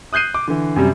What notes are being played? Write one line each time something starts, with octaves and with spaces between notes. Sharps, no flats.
D#6 F#6 G6 C7 D#7
D6
D3 E3
F#2 C3 G3